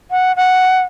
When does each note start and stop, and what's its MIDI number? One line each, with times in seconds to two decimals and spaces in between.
0.11 0.35 78
0.36 0.81 78